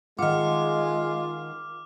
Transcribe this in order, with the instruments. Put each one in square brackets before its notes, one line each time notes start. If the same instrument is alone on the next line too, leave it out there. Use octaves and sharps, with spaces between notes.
[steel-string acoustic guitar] D#3 F#5 [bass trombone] G#3 [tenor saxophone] F4 [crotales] D6 F6